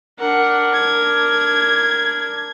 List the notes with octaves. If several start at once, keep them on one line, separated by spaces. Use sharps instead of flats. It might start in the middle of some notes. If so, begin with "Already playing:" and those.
D4 A#4 F#5
G#6